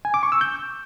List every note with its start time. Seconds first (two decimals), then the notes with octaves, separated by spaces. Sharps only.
0.05 G#5
0.14 D6
0.23 C#6
0.32 E6
0.41 G6